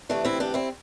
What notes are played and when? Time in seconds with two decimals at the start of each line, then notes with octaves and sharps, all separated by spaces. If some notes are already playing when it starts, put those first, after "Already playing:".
0.09 D2 C3 E3 A3 D4
0.25 C4 E4
0.40 D4 G4
0.54 C4 E4